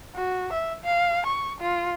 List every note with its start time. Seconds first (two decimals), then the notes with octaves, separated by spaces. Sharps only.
0.16 F#4
0.53 E5
0.84 F5
1.26 C#6
1.60 F4